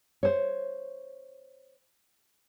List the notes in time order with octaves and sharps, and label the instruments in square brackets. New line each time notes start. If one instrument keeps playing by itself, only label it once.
[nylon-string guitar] C5 C#5